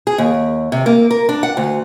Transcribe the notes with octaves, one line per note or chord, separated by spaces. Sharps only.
G#4
D#2
C3
A#3
A#4
D4
F#5
D2